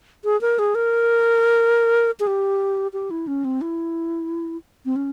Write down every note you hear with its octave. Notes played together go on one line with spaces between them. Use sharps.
G#4
A#4
G#4
A#4
G#4
G4
G4
E4
C#4
C4
E4
C4
C#4